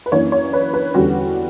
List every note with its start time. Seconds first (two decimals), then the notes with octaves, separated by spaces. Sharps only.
0.06 B4
0.12 F#2 E3 A#3 D4 C#5
0.32 C#5
0.53 B4
0.74 B4
0.94 E2 D3 G3 C#4 F#4